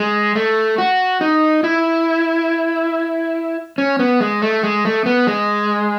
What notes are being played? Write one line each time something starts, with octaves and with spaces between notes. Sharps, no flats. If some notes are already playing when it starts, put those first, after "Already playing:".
Already playing: G#3
A3
F#4
D#4
E4
C#4
B3
G#3
A3
G#3
A3
B3
G#3